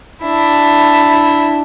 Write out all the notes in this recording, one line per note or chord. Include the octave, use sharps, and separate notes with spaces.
D4 E4